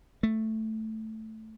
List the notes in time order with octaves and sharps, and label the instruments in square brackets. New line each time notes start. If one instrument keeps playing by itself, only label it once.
[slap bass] A3